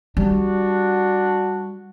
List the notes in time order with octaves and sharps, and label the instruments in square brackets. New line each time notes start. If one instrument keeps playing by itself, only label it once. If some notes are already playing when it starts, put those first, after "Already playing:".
[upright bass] G3 [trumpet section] D4 F#4